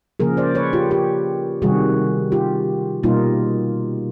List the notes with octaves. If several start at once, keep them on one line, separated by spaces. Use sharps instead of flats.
C#3 F3 A#3 G#4 A#4
C5 D5
B4 C#5
F4 G4
F4 G4
C3 D#3 G3 F#4 G#4
F4 G4
B2 G3 A#3 D#4 F4